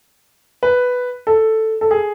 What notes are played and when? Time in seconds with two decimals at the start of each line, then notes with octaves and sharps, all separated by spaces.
0.63 B4
1.27 A4
1.81 A4
1.91 G#4